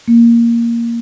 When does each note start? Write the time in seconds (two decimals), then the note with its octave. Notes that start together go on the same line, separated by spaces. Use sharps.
0.08 A#3